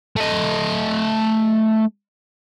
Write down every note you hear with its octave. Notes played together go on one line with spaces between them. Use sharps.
A3 D#5